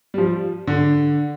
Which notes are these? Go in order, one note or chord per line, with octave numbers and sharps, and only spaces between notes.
G3
F3
D3